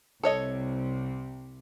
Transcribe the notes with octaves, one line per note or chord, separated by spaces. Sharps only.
C2 C3 A4 C#5 D#5